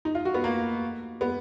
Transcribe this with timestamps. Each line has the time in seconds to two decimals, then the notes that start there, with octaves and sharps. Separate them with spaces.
0.05 D#4
0.15 F4
0.25 F#4
0.34 B3
0.44 A#3
1.21 B3